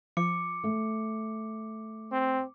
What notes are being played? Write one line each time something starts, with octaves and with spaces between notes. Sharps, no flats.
F3 D6 C#7
A3
C4